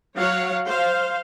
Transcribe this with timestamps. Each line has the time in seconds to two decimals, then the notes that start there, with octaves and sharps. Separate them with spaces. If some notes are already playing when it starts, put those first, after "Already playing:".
0.16 F#3 C#5 F5 F#5
0.66 C5 F5